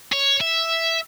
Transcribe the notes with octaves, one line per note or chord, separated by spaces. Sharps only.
C#5
E5